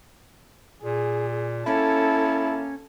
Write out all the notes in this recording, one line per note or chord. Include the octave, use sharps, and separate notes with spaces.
A#2 G#4
A#3 C#4 E4 A4 A5